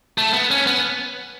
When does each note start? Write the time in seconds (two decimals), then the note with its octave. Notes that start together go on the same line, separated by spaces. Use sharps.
0.18 A3
0.33 B3
0.51 C#4
0.67 B3